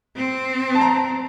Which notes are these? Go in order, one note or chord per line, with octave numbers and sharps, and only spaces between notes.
C4
A5
A#5